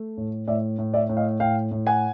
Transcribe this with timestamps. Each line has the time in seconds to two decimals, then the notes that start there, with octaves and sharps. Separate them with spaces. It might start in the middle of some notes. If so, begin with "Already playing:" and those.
Already playing: A3
0.17 A2
0.47 A2 D5 E5
0.78 A2
0.94 D5 E5
1.09 A2
1.17 D#5 F5
1.40 A2 F5 G5
1.71 A2
1.87 F#5 G#5